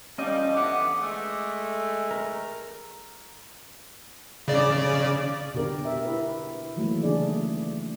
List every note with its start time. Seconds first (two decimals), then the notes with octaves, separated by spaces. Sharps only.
0.18 F3 G3 C#4 D#5
0.55 D3 E3 B3 D6
1.00 G#3 A3
2.11 A#4
4.48 C#3 D5
5.54 B2 D3 G4 A#4
5.85 E5
6.05 E4 B4
6.76 D#3 E3 F#3 A3 A#3
7.03 C#3 A3 D4 G#4 D5